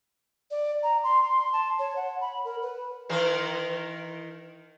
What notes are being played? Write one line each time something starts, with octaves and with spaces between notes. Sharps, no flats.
D5
A#5
C6
C6
A5
C#5
F#5
B5
A#4
B4
D#3 E3 A#4